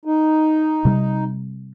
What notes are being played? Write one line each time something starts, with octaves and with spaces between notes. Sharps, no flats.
D#4
C3 G3